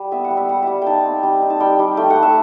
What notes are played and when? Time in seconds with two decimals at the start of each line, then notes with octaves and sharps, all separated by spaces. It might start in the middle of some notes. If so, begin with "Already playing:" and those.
Already playing: G3
0.12 B3 E5
0.24 F#5
0.30 G3
0.37 E5
0.49 G3 F#5
0.62 G3 E5
0.82 D#4 G5 A5
1.05 C4
1.23 G3
1.42 D#4
1.50 A5
1.60 G3 G5
1.79 G3
1.97 A3 G5
2.10 F#5
2.16 A3
2.22 E5